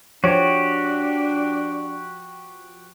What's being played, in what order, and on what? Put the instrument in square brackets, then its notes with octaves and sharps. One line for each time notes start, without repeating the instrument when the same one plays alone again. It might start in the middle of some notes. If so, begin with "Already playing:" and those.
[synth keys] F3 [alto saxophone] D4 [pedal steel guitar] F#4 G4 [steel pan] C#5